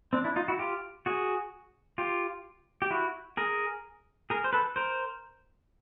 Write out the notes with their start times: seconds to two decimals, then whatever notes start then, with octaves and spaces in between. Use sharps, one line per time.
0.13 C4 D4
0.24 D4 E4
0.36 D#4 F4
0.48 E4 F#4
0.59 F4 G4
1.06 F#4 G#4
1.98 F4 G4
2.82 G4
2.91 E4 F#4
3.37 G#4 A#4
4.30 G#4 A#4
4.44 C5
4.53 A4 B4
4.76 A#4 C5